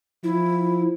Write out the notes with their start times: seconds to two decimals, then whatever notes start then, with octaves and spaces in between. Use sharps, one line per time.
0.24 F3 E4